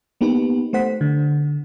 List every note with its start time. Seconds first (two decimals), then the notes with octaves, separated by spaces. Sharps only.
0.21 A#3 B3 D#4 G4 B4
0.73 A3 C5 F#5 B6
1.01 D3